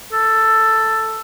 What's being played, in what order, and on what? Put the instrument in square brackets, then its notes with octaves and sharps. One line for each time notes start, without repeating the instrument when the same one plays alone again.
[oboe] A4